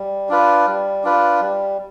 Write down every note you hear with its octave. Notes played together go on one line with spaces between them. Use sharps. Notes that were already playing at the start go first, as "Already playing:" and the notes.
Already playing: G3
D4 F4 B4
G3
D4 F4 B4
G3